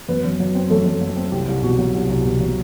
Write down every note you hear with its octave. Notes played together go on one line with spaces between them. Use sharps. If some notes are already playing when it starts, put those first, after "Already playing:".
F#2 B3 B4
F#2
F#3
C4
F#2 A3 A4
F#2
F#3
C4
C2 G4
C2
B2 F#4
F#3
C2
C2
B2
F#3